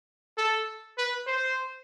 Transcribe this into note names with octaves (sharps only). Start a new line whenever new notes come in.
A4
B4
C5